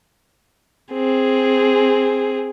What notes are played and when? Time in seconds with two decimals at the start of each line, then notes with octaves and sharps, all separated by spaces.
0.93 C4 G#4